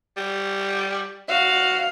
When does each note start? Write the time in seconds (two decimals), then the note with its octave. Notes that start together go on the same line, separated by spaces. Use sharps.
0.17 G3
1.29 F#4 F5